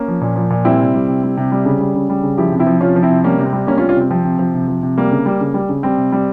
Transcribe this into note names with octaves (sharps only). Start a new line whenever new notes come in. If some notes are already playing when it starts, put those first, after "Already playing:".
Already playing: A#3 C#4
F3
A#2
F3
A#2
G3 C4 E4
C3
G3
C3
G3
C3
G3
C#3
G3
C#3
G3
C#3
F3 E4 G4
C3
C4 E4
F3
C3 C#4 F4
F3
C4 E4
C3
G3 A#3 C#4
C3
C4
G3
C3 A#3 C#4
C#4 F4
G3
C#4 F4
C3 C4
F3 C4
C3
F3
C3
F3
C3
G3 A#3
C#3
G3
C#3
G3
C#3
G3 C4
C3
G3